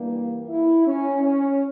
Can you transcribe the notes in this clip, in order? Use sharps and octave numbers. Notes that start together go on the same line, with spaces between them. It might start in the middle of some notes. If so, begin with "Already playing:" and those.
Already playing: G2 E3 G3 A#3
E4
C#4
C#4